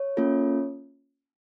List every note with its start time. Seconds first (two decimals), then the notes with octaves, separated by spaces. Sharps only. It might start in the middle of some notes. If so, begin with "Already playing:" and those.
Already playing: C#5
0.17 A#3 C#4 F4 A4